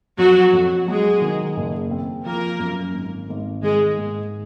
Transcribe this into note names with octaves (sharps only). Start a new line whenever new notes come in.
F2 F#3 F#4
F2
F#3 G#3 G#4
D#3
F#1
C4
F3 A#3 A#4
F#2
G#1
G#1
D#3 G#3 G#4
G#2